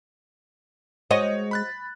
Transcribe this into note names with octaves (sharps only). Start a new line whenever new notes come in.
G#3 F#4 C5 C#5 D#5 F#5
B5 F#6 A6